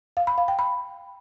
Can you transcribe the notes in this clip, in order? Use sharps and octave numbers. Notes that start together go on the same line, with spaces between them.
F5
B5
F5
G5
B5